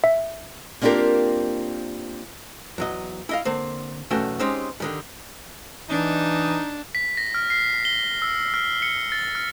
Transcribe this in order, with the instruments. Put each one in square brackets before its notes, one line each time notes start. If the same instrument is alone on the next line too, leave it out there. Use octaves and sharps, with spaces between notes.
[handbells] E5
[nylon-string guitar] A#3 C4 D4 F4 G4 A#4
[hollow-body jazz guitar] E2 F#3 D#5
E4 D#5 F5
D3 A#3 C4
B1 E2 A3 C#4 F#4 G5
G#3 C4 C#4 D#4 G4
D3 D#3 G3
[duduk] E3 [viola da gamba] D4 [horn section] D#4
[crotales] B6
A#6
F6
C7
G7
E6
F6
C#7
A6
F6